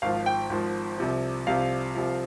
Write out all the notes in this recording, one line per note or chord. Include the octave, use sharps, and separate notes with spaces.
G#1 G#2 F3 F5
G5
G#1 G#2 F3
C2 C3 F3
C2 C3 F3 F5
C2 C3 F3